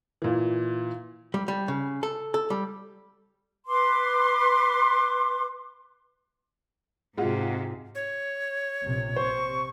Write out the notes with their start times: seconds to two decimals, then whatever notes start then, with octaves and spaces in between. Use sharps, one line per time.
0.22 A#2 E3
1.34 G3
1.48 G3
1.68 C#3
2.03 A4
2.34 A4
2.50 G3
3.67 B4 C6 D6
7.17 G#2 C3 G#3 F4 F#4
7.95 C#5
8.83 A#1 C3
9.16 C3 C5 C#6